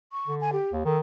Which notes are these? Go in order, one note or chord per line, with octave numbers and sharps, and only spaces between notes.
C#6
D3
G#5
G4
D#2
D#3 A4